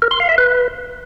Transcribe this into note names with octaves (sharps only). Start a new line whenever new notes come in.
A#4
C6
F5
E5
B4